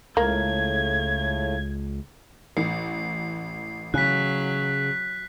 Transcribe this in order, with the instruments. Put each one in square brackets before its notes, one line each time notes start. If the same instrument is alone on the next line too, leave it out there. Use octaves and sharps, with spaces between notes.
[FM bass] C#2 [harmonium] A2 C#3 A3 [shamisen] A#3 [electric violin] G#6
[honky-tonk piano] A1 [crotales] C7
[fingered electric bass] C#3 [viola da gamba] F#3 [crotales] F#6 B6